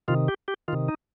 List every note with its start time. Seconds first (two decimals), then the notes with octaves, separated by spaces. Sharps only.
0.08 C3 D#3 F4
0.28 G4
0.48 G4
0.68 D#3 F4
0.73 C3
0.88 D#4